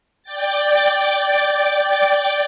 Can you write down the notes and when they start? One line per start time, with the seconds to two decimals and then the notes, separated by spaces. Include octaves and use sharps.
0.23 D5 G5 A6